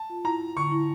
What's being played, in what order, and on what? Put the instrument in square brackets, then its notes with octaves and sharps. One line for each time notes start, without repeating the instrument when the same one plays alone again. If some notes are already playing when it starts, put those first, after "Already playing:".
Already playing: [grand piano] A5
[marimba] F4
[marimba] E4 [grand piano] A#5
[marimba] E4
[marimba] D3 [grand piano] C#6
[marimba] E4